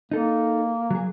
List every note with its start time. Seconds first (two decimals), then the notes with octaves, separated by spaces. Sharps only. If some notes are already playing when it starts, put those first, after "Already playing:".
0.12 A#3 D#4 A4
0.91 F#3 G#4